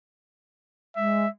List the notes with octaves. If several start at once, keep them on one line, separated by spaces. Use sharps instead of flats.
G#3 E5